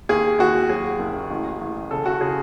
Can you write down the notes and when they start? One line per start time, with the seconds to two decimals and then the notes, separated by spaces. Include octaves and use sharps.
0.09 D#2 G#4
0.39 D#2 F#4
0.69 F#3 G#4
0.99 F#1
1.31 A1
1.61 A1
1.91 C#3 A4
2.06 F#4
2.21 C#3 G#4